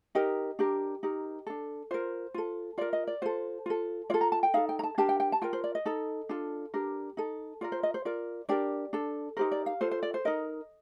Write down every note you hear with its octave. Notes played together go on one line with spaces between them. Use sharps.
D#4 G4 A#4 D#5
D4 G4 A#4
D#4 G4 A#4
D4 A4
F4 A#4 C5
F4 A4
F4 A#4 D5
D#5
D5
F4 A4 C5
F4 A4
F4 A4 D5
A#5
A5
G5
D#4 A4 F5
G5
A#5
A5
D4 G4 A#4 A5
G5
G5
A5
F4 A#4 G5
C5
D5
D#5
D#4 A4
D4 F4 A4
D4 G4 A#4
D#4 A4
F4 A#4 D5
C5
D#5
C5
F4 A#4 D5
D4 G4 A#4 D5
D4 A4
D#4 G4 A#4 C5
D5
F5
F4 A4 C5
C5
D5
C5
D#4 A#4 D#5